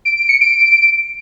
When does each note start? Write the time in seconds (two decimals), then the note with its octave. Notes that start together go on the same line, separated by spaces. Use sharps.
0.05 D7
0.17 D7
0.29 C#7
0.41 D7